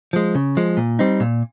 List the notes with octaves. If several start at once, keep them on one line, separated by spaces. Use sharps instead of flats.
F3 G#3
C#3
F3 G#3
A#2
G3 C4 D#4
A#2